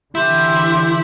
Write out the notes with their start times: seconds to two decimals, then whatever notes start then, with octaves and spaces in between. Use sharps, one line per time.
0.15 D3 E3 E4 G4 C6 G6